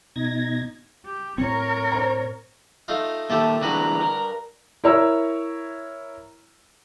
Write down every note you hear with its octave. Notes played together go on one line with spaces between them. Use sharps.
B2 D#4 G#6 A#6
G4
A2 C4 A#4 C#5
C5 A#5
A3 D#4 F4
A#2 D#3 A3 G4 E5 A5
G2 D3 E3 G#3 F#4 A#5 B5
A#4
E4 A#4 C#5 A#5 E6